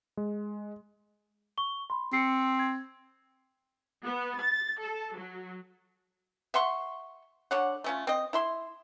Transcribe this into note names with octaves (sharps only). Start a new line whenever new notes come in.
G#3
C#6 G7
B5 C6
C4 C7 C#7
G#6
B3
A6
A4
F#3
E5 F#5 C6 C#6
D3 C#5 F#5
A3 C#4 F4
C4 D#5
E4 E5 C6